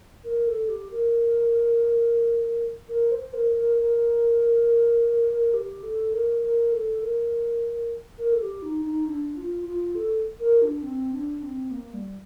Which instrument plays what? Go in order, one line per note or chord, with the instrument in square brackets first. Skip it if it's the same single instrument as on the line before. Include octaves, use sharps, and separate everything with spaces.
[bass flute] A#4
A4
G4
A#4
A#4
C5
A#4
A#4
A#4
G4
A4
A#4
A#4
A4
A#4
A#4
A4
G4
D#4
D#4
D4
F4
F4
A4
A#4
D4
C4
D4
C4
A#3
G3